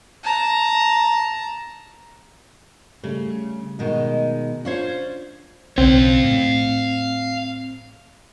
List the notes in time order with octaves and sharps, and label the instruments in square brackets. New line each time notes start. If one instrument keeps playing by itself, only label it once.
[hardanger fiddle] A5 A#5
[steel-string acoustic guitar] C#3 [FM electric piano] G3 A3
[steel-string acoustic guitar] B2 D#3 G#3
[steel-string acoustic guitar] C#4 F4 C5 [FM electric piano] D4 C#5 G#6
[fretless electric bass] B1 C#3 [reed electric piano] C4 [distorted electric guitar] F5 G5
[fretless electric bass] A2